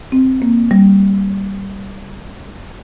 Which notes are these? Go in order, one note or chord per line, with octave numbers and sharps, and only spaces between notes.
C4
A#3
G3